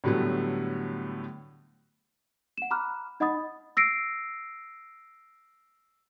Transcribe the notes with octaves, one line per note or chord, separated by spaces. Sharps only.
A2 D3 F#3 G3 A3 B3
F#5 E7
A#5 B5 D6 F6 F#6
D#4 D#5 F#5 B5 D#6 A6
E6 A#6 C7 D7